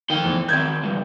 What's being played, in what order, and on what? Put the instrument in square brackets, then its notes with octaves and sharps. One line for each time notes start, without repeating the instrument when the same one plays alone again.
[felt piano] D#3 [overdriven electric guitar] F3 G5
[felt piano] E2
[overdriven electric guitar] D#3 C4 [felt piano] G6 G#6
[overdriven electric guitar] C#2 G2